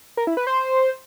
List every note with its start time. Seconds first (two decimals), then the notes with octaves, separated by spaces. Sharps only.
0.17 A#4
0.27 E4
0.37 B4
0.47 C5